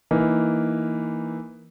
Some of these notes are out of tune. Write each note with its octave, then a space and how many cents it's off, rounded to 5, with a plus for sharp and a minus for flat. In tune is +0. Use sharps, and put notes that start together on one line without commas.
E3 +0 A#3 +0 D#4 +0